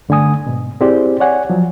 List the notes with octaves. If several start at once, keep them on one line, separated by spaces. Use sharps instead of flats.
G2 D3 A3 G#5 D#6
G#2 B2
C4 E4 G4 G#4 C5 D5
C#5 D5 F#5 G#5
F3 F#3